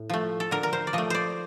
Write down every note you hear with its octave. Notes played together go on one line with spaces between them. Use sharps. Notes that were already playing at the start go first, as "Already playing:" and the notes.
Already playing: A2
F3 A3
A4
D3 A#4
A#4
C5
D5
F3 A3 D#5
C5 D5